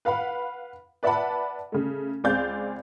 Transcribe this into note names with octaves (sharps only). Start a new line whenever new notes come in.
B4 F5 F#5 B5
B4 D5 E5 F#5 A5 B5
C#3 A3
C#2 C4 G#4 D5 F5 G6